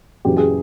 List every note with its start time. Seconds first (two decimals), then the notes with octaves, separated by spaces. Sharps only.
0.25 F#2 C#3 E3 G4
0.37 G#4